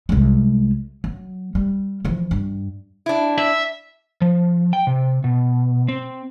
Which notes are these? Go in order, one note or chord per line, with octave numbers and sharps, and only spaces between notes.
C2 G#3
F#3
G3
E3 F3
G2
D4 E4
E5
F3
G5
C3
B2
C4